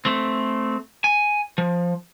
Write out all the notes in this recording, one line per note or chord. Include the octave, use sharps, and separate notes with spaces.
A3 C4
G#5
F3